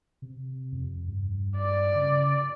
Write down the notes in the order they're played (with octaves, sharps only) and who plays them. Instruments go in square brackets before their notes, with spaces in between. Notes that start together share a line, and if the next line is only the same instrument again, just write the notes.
[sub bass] C3
F2
G2
[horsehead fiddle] D5
[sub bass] C#3